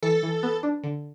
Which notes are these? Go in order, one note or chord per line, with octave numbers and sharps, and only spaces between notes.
E3 A4
E3
B3
D4
D3